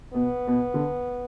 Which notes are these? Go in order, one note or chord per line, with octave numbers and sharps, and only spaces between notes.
B2 B3
B2
D3